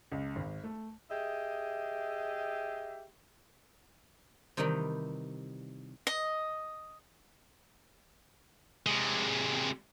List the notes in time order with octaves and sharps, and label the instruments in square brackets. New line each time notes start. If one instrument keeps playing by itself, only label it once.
[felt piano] C#2
G#1
A3
[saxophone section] G4 G#4 D#5 E5
[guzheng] C3 D#3 E3 G3 D#4 B5
[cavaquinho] D#5
[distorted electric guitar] C3 G#3